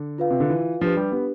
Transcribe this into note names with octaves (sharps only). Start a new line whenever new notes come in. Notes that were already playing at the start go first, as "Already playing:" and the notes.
Already playing: D3
F4 B4 F5
C3
D3
E3
F3 D4 G4 B4
G3
B3